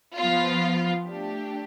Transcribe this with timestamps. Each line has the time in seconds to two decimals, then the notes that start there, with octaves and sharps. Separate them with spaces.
0.17 F3 B3 F4
1.06 A3 D4 G4